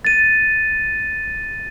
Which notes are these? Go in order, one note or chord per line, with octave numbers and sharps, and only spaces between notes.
A6 D#7